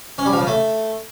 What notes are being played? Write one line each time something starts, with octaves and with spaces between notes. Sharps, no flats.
C#4
G3
F3
C#3
A3